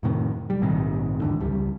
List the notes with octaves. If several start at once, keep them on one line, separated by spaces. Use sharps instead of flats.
F2 A2 C3 D#3
G3
A#1 G#2 C3 D#3
E2 G#2 D3
C#2 G3